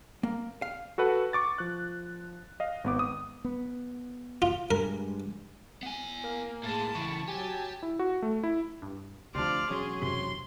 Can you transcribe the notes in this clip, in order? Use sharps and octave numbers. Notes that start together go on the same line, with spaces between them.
A#3
F5
F#4 A4 B4 F#5
C#6 D6 A6
F3 F#6
D#5 F5
G#1 B3 D6
D#6
B3
F4
G2 G#3 A#4
B3 G#5
A#3
A2 G#3 A5 B5
C#3 E3 C#6
F#3 G4 G#5 A5
E4
F#4
A3
E4
G2
D2 C3 F3 D4 D5 C6 F6
E1 F#3 C#4 G#4 C#5 C6
F#2 C3 C6